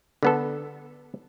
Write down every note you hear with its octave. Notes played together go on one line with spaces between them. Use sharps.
D3 B3 A4